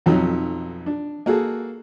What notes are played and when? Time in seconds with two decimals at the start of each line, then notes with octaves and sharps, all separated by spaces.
0.06 B1 F2 F#3 D#4
0.86 D4
1.26 A#3 F#4 G#4 A4